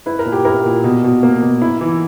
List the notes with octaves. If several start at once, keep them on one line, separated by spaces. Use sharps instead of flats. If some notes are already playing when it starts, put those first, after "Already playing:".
E4 B4
A#4
A#2
G4
E4 A#4
A#2
B2
B2
A#3
B2
E4
E3